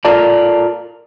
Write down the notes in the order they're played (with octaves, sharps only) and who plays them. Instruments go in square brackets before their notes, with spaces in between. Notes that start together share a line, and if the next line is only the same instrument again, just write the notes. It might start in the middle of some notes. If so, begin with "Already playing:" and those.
[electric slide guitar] F4 A4 A#4 D5 A5